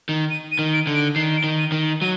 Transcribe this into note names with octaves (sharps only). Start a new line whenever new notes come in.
D#3
D#7
D#7
D#3
D7
D3
D7
D#3 C7
D7
D#3
D#7
D#3
F#3 D#7